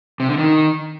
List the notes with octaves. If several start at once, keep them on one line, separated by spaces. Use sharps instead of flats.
C3
D3
D#3